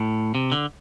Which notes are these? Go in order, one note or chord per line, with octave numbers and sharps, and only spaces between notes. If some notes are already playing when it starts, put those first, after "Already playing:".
Already playing: A2
C3
D3